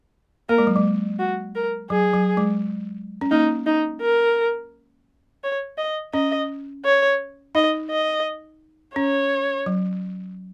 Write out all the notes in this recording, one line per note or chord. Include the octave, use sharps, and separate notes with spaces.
A#3 A#4
G#3
F#3
G#3
F#4
A#4
F#3 G#4
F#3
G#3
C#4
A#3 D#4
D#4
A#4
C#5
D#5
C#4 D#5
C#5
D#4 D#5
D#5
C#4 C#5
F#3